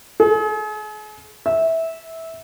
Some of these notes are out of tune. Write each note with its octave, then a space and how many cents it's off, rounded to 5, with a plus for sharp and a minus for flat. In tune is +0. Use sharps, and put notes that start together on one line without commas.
G#4 +40
E5 -15